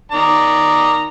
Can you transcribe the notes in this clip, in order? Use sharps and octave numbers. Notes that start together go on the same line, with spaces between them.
D#3 D5 A#5